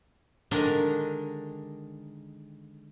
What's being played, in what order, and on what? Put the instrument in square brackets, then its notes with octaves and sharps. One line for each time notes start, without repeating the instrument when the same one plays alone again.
[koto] D3 D#3 G#3 D4 A#4 A#5